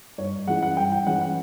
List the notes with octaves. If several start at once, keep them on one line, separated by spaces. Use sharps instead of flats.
G2 C#5
E3 G#3 C#4 E4 F#5
F#5
G2 G5
G5
E3 G#3 C#4 E4 F#5
F#5